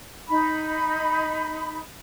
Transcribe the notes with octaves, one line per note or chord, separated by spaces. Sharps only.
D#4 B5